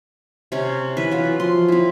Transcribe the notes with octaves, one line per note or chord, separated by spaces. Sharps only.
C3 C#4
E3 B4 E5
F#3 F4
F3 C6
C4 E4